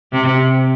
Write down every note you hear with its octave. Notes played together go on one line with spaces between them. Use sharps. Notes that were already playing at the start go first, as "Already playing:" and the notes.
C3